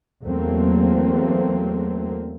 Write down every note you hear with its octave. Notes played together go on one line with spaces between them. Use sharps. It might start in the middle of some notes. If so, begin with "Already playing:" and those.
E2 F#3 A3 A#3 C4